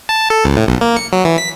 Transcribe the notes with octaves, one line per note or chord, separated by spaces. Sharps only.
A5
A4
C#2
A2
B1
A#3
C#7
F#3
E3
B6